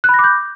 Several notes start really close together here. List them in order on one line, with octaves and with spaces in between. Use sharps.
F#6 B5 A#6 D6 G6